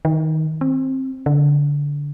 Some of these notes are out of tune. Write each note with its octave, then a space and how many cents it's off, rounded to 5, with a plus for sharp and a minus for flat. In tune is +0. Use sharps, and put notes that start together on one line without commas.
D#3 +15
C4 +15
D3 -20